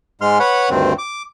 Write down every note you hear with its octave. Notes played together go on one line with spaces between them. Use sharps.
G#2 G#3 C6 F6
B4 C#5 F#5 B5
D2 G2 D#3 C4
D6